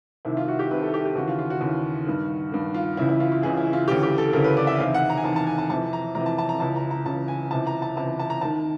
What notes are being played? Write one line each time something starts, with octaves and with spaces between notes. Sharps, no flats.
C2 C3 D#3 E4
F4
F#4
G4
C2 C3 D#3 B4
A4
G4
G4
D#2 C#3 E3 F#4
F4
F4
F#4
D#2 C#3 E3
G2 D#3
G2 D#3
F4
C#2 C#3 E3 E4
E4
F4
F4
C#2 C#3 E3 G#4
E4
F4
D2 C#3 E3 G4
G4
A4
D2 C#3 E3 A#4
B4
D5
E5
E2 C3 D#3 F5
F#5
A#5
G#5
E2 C3 D#3 A5
A5
G#5
A5
F2 C3 E3 A5
A#5
F2 C3 E3 A#5
A5
A5
A#5
C#2 C#3 E3 A5
A#5
A#5
C#2 C#3 E3 A5
G#5
C#2 C3 E3 A5
A#5
A5
C#2 C3 E3 A5
A5
A#5
D#2 D#3 A5